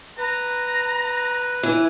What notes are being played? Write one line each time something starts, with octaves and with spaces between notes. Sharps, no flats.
B4 A#5
E3